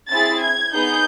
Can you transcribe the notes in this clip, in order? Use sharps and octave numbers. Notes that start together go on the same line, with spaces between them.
C4 E4 G#4 A6
G#6
B3 D#4 G#4 G6